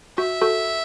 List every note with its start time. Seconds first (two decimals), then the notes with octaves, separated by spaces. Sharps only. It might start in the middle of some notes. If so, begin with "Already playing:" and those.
0.18 F#4 E5
0.41 F#4 A4